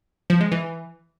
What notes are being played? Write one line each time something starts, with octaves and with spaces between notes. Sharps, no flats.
F3
G#3
E3